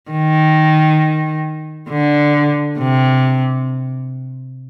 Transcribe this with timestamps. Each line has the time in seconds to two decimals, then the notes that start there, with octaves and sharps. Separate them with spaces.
0.11 D#3
1.90 D3
2.78 C3